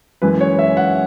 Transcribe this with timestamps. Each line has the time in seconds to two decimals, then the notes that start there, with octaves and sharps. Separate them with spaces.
0.22 F#2 E3 G#3 B4
0.41 C#5
0.59 E5
0.77 F#5